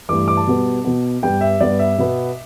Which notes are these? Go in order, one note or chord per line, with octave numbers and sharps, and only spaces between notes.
G2 E3 A3 D6
D6
A5
B2 G3 B3
B2 B3
G2 G3 B3 G5
E5
G2 G3 B3 D5
E5
B2 B3